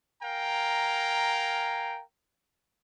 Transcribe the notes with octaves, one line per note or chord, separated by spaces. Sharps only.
A#4 F5 G5 G#5 A#5